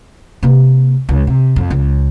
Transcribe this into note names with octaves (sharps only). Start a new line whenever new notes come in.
C3 A#3
C#2
C3
F2
C#2